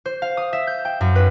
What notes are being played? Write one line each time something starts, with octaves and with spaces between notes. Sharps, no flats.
C5
F5
D#6
E5
G6
G5
F#2
B4